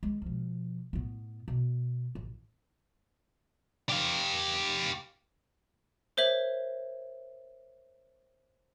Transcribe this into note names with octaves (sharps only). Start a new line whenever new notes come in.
G#3
B2 F3
A2 B3
B2
A1
G4 F5
A#4 C5 C#5 E5 F#7